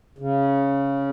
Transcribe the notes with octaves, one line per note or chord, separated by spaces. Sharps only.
C#3